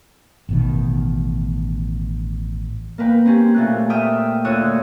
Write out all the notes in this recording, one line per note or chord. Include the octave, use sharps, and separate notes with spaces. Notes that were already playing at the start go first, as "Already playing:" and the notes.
A1 B2 D#3
A#3 A#4 B4 G5
C4 C#4 G4
A#2 A3 F#6
E5 G5 D#6 F6
D2 F4 C#5 D#6 E6 F#6